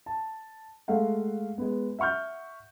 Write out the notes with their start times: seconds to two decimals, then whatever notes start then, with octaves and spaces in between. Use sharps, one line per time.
0.06 A5
0.88 G#3 A3 F5 F#5
1.58 G#3 B3
1.99 E5 F#5 C#6 F6 G6